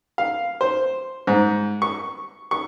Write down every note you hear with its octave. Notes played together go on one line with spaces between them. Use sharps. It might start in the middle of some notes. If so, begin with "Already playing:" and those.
F5
C5
G#2
C#6
C#6